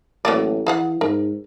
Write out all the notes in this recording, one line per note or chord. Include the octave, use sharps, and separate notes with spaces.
A1 F#3 A#3 D5
E3 G#4 F5 F#5
G#2 A#4